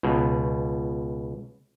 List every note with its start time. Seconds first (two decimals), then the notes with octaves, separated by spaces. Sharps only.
0.03 C#2 B2